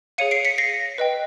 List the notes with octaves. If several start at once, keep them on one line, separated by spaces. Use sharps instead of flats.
G#4 C#5 F5 C#7 D#7
C7 D7
B6 C#7
A#6 C7
B4 D#5 G5